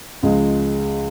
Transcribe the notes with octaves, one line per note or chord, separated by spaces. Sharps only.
C#2 C#3 F3 G#3